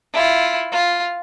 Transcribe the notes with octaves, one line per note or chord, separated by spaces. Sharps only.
E4 F4
F4